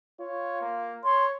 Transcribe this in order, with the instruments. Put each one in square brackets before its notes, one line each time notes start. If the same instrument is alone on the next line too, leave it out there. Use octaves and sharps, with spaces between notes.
[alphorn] F4 [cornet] C#5
[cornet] A#3
[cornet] C#5 [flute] C6